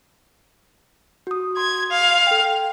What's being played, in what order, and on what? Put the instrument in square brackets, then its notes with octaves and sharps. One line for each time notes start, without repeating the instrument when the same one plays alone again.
[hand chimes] F#4 D#6
[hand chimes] C6 [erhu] G#6
[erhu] F5
[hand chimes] A4 G5